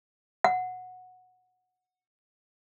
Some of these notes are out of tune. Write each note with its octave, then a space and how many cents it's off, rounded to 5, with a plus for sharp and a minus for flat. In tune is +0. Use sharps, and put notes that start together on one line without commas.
F#5 -10